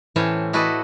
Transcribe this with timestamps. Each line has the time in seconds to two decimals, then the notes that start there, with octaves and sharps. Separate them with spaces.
0.16 A2 E3 C4 C#4 C#5 A5
0.53 E4 F#4 A4 B4 D5 D#5